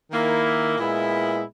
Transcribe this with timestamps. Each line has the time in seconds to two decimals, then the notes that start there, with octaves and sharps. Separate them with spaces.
0.11 D#3 A#3 E4
0.77 A#2 G#3 B3 E4